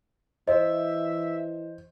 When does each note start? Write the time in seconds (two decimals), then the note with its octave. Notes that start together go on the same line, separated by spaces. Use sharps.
0.48 E3 C5 D#5 E5